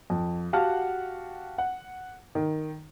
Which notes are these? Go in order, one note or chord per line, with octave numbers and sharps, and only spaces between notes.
F2
F#4 G4 F5 F#5 A5 F6
F#5
D#3